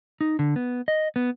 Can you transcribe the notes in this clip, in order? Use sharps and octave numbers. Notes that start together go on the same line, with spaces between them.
D#4
D3
B3
D#5
B3